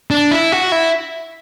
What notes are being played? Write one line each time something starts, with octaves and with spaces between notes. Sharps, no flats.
D4
E4
F#4
E4